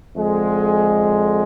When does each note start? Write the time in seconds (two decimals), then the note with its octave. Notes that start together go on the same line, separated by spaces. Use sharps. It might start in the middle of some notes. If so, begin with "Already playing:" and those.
0.15 F2 D3 G#3